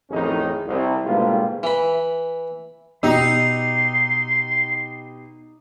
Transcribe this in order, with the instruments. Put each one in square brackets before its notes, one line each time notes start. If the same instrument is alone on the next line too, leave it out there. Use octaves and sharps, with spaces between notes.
[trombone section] A1 F2 D#3 C#4 D#4 G#4
C2
G#2 B2 D3 G3 A#3 F4
[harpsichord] E3 B5
[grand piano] B2 G4 E6 [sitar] D#4 [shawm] C6